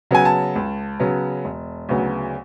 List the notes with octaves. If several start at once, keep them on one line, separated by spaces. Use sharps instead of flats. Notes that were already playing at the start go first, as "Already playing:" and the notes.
C#3 F#3 B3 G#5
A5
C#2
C#3 F#3 B3
E1
D2 C#3 F#3 B3